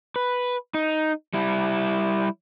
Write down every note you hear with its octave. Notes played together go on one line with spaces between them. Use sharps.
B4
D#4
G3 E4